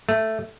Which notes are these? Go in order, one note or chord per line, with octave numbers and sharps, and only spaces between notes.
A3